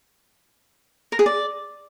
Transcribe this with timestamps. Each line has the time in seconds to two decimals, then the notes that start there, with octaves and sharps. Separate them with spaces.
1.12 A#4
1.19 G#4
1.26 D5